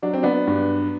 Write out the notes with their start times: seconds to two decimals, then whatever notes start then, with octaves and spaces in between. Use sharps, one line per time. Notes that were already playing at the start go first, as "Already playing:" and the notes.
0.02 F#3 D4
0.13 C4
0.23 B3 D4
0.47 G2